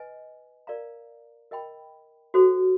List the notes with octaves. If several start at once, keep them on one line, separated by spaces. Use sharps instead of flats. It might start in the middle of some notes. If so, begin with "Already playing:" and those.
Already playing: B4 D#5 G#5
A#4 D5 F5 A#5
A#4 D#5 G5 B5
F#4 A4 C5